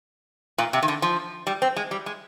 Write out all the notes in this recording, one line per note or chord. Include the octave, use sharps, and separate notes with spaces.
A#2
C3
D#3
D3
F3
G3
C4
G#3
G3
G#3